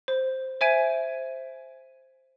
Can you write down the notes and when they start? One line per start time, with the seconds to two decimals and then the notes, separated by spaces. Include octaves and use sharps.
0.08 C5
0.61 C5 E5 G#5 G#6 D7 D#7